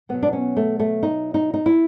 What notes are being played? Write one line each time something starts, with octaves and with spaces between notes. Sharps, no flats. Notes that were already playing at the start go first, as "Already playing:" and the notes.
B2 F#3 B3
D4
C#4
A3
A3
D#4
D#4
D#4
E4